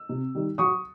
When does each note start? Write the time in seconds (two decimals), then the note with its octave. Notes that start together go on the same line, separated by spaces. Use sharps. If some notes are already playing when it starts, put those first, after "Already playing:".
Already playing: E6
0.09 C3
0.35 D#3 G3
0.58 F#3 C#6 D#6